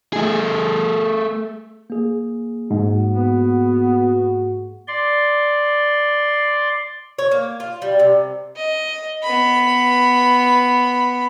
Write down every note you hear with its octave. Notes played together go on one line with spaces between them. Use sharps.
A3 G#4
A#3 G#4
G#2 F#4
B3
D5 C6
C#5
A#3
F4
G3
C3
D#5
B3 B5